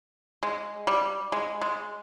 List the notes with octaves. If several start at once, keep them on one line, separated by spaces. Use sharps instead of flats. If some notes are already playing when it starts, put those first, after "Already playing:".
G#3
G3
G#3
G#3